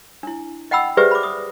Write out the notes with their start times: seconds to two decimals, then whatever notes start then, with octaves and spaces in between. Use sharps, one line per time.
0.23 D4 E4
0.71 D#5 F#5 G5 B5 E6
0.97 G4 G#4 B4 C5 D5 E5
1.11 B5 D6
1.23 D#6